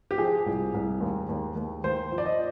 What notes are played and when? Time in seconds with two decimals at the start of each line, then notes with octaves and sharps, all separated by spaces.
0.11 G4
0.18 F3 G#4
0.46 C2
0.74 C2
1.01 D#2
1.29 D#2
1.56 D#2
1.84 D#2 C5
2.12 F3
2.18 D5
2.25 D#5